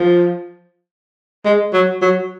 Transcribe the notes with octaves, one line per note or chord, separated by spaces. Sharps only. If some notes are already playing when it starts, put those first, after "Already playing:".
Already playing: F3
G#3
F#3
F#3